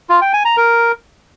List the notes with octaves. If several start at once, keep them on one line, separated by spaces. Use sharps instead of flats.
F4
G5
G#5
A#5
A#4